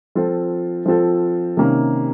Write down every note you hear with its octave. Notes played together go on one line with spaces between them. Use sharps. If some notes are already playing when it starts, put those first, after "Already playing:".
F3 C4 F4 A4
F3 C4 F4 A4
C3 D#3 A#3 C#4